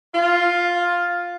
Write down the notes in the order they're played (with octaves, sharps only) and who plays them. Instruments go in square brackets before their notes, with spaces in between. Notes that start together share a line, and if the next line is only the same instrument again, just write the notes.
[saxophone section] F4